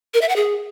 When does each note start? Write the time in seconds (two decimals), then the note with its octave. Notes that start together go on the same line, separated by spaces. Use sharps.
0.14 A#4
0.21 E5
0.29 F#5
0.36 G#4